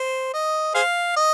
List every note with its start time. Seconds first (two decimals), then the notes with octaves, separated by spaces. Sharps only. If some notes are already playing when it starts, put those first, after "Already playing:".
Already playing: C5
0.33 D#5
0.75 G#4 C5 F5
1.16 D#5